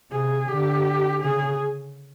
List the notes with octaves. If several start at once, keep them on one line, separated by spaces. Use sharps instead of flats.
C3 G#4
D3 G4
C#3 G#4